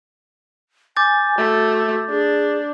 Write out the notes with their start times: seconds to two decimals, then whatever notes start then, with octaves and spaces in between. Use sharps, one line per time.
0.97 G#5 D6 G6 A6
1.38 A3 F#4
2.09 D4 G#4